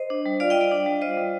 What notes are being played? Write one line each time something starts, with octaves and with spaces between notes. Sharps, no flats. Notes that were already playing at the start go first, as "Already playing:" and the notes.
Already playing: C5 D#5
D4
G3
F4 D5 F5
G3 D#5 G5
D5 F5
D4
G3
F4 C5 D#5
G3